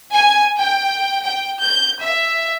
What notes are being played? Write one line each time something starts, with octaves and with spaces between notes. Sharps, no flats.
G#5
G5
G5
G6
E5